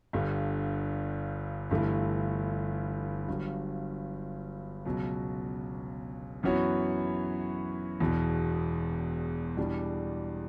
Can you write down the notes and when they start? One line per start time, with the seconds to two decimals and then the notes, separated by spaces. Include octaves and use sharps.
0.13 G1 G2 D3
1.71 G1 G2 E3 A3 E4
3.28 G1 G2 F#3
4.85 C#2 B2 F#3
6.43 F#2 E3 B3 F#4 C#5
8.00 E1 E2 B2
9.57 E2 B2 G3 D4